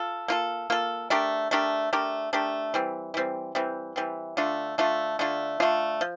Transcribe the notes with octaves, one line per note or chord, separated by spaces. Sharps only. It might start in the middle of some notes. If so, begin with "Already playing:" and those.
Already playing: F4 A4
A#3 F4 A4
A#3 F4 A4
A3 D4 G4 A#4
A3 D4 G4 A#4
A3 D4 G4 A#4
A3 D4 G4 A#4
E3 G3 C4
E3 G3 C4
E3 G3 C4
E3 G3 C4
D3 A3 D4 F4
D3 A3 D4 F4
D3 A3 D4 F4
D3 A3 D4 F4
F3